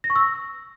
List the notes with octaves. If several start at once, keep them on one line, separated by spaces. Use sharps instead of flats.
A#6
C#6
E6